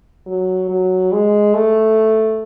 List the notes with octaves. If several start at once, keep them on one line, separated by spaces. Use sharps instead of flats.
F#3
F#3
G#3
A3